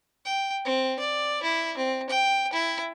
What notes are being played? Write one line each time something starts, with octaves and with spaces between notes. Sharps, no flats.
G5
C4
D5
E4
C4
G5
E4